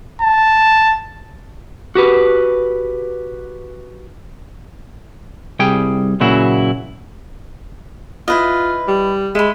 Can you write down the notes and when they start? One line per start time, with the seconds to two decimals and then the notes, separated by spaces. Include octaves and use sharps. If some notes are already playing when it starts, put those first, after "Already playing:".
0.21 A5
1.95 F#4 G4 B4
5.59 C2 G3 G#4 G5
6.21 A#2 C#3 F#3 E4 F#4
8.28 E4 F4 B4 D#5
8.88 G3
9.35 G#3 E5 B5